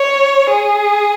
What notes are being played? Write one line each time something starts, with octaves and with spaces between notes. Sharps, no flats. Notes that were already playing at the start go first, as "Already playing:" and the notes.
Already playing: C#5
G#4